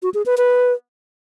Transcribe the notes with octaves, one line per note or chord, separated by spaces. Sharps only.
F#4
G#4
B4
B4